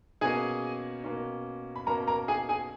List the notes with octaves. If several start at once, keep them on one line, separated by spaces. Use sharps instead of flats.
B2 A#3 C#4 G#4 G#5
B2 A#3 C#4
B5
B2 A#3 C#4 A#4 A#5
A#4 A#5
G#4 G#5
G#4 G#5